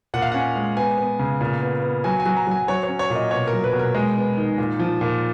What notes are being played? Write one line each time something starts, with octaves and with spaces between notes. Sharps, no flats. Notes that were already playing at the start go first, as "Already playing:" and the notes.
A#2 F#5
F5
C#4 F#5
G#3
B3 G#5
B3
C#3
A#2
B3
B3
F#3 G#5
G#5
F#3
A#5
F#3 G#5
F#3 C#5
C#5
C#4
C#5
A#2
D#5
B2 C#5
A#4
F#3
B4
B2
A#4
G#3
B3
D#3
A#2
F3
A#2